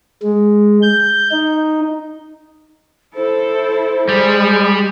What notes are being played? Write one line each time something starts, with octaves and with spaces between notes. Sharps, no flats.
G#3
G6
D#4
E4 A4 C5
G3 G#3